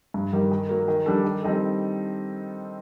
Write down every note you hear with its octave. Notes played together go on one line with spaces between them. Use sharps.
G2
D#3 G3
D#3
F#3 A#3
D#3
G3 D4 A4
D#3
G3 C4 D#4 A4